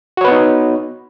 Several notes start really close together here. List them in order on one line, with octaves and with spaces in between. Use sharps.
F#4 C#5 B4 B3 D#4